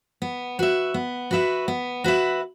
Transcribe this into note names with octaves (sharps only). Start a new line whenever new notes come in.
B3
F#4 B4 E5
B3
F#4 B4 E5
B3
F#4 B4 E5